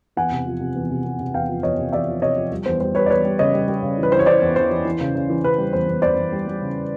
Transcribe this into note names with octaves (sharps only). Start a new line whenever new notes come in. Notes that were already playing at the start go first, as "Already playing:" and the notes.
E2 F#5 G#5
C3
F3
C3
E2
C3
C3
C3
E2 F5 G5
F3
E2 C#5 D#5
C3
E2 D5 E5
F3
C3 C#5 D#5
F3
G3
E2 C5
G3 C5
G3 B4 C#5
D5
E2 B4 C#5
G3
C#3 C#5 D#5
G3
G3
C#3
E3
B4
E3 C5
C#5
E3 C5 D5
E2
E3 C5
E3
E3
C#3
C#3
E3
C#3 B4
G3
E2 C5
E2
E2 C5 D5
E2
G3
G3
C#3